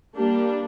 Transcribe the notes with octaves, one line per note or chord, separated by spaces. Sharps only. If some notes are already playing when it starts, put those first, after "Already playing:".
G3 A#3 D4 G4